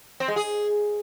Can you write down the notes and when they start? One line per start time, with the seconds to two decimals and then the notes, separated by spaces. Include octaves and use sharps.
0.20 C4
0.28 G#3
0.36 G#4